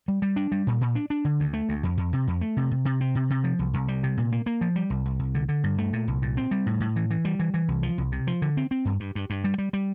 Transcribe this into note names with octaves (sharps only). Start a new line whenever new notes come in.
G3
G3
D4
G3
A#2
A#2
D4
D4
D3
D2
A3
D2
F2
F2
C3
F2
A3
C3
C3
C3
C4
C3
C3
F3
C2
C2
G3
C3
A#2
A#3
A#3
F3
G3
C2
C2
C2
D3
D3
G2
A3
A#2
C2
A#2
C4
G3
A2
A2
E3
E3
G3
E3
E3
C2
F3
C2
C3
F3
D3
C4
C4
G2
G2
G2
G2
G3
G3
G3